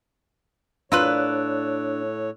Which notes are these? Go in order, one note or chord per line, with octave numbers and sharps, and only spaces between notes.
A2 A#3 D4 F4 B4 C#5 E6 F#6